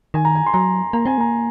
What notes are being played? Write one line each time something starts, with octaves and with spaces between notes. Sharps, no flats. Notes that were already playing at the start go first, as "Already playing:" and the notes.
D#3 G#5
A#5
G#5
C6
F#3 A#5
A#3 A#5
C4 G#5
A#3 A#5